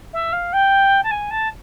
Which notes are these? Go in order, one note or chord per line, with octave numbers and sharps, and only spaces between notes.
E5
F5
G5
A5
G#5
A5